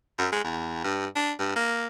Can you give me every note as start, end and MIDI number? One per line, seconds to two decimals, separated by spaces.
0.19 0.29 42
0.32 0.43 56
0.44 0.81 40
0.84 1.07 43
1.16 1.32 62
1.39 1.51 43
1.56 1.87 58